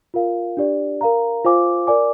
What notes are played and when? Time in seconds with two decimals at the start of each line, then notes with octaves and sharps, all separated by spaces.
0.14 F4 A#4 F5
0.57 D4 G4 D5
1.01 A#4 F5 A#5
1.45 F4 C5 F5 G#5 D6
1.87 A#4 D5 G#5 D6